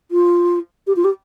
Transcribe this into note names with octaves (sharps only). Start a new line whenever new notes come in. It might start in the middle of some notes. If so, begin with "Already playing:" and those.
F4
G4
F4
G4